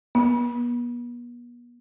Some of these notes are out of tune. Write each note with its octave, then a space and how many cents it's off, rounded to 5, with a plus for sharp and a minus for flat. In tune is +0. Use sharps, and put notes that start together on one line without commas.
B3 -40